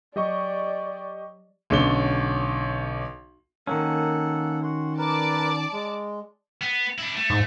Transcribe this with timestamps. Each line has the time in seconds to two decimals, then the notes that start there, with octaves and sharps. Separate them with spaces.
0.16 F#3 G4 D5 D#5 C#6
1.70 B1 D3 C#4 G7
3.67 D#3 A#3 C#4 A4 F#5
4.63 F#4 F#5 C6
4.98 A#4 B4 D5 A5 D6
5.72 G#3
6.61 B3
6.98 D4 E4
7.16 A3
7.30 G#2